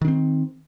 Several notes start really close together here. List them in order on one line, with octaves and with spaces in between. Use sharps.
D#3 D4 C4